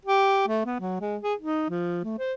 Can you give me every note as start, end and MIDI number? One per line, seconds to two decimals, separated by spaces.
0.05 0.47 67
0.48 0.64 57
0.66 0.78 59
0.80 0.97 54
1.01 1.17 56
1.23 1.34 68
1.40 1.68 63
1.70 2.02 53
2.04 2.15 57
2.19 2.34 72